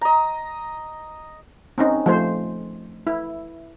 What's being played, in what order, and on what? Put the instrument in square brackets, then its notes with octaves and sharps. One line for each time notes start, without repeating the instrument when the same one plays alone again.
[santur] D#5 A#5
[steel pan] C4 C#4 D#4
F3 A3 C5
E4